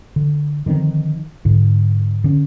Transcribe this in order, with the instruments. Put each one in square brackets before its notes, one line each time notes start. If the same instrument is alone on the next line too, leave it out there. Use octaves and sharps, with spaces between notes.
[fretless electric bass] D3
D3 D#3 F3 C4
G#2 D3
D3 C#4